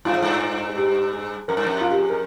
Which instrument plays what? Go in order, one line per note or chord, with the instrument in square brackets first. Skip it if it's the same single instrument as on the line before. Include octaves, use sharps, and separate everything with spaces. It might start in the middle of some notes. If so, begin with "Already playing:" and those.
[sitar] G2 [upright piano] F4
[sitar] G#2
G2
[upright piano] G#4
G4
G#4
[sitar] F2 [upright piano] A#4
[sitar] G2
F2
[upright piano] F4
G4
G#4
A#4